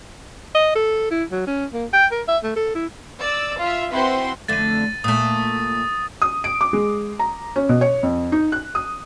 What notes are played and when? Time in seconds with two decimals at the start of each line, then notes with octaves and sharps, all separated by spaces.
0.55 D#5
0.75 A4
1.11 E4
1.32 F#3
1.47 C#4
1.73 A#3
1.93 G5
2.12 A#4
2.28 E5
2.43 A3
2.56 A4
2.75 E4
3.19 D5 E6
3.60 F4 E5
3.92 C4 E4 F#4 B4 G5 C6
4.48 F2 D3 A3 A6 D#7
5.04 A#2 A3 D#6
6.22 D#6
6.44 D7
6.61 D6
6.73 G#3
7.19 A#5
7.56 C#4
7.69 B2
7.81 C#5
8.03 F2
8.32 D#4
8.52 F#6
8.75 D#6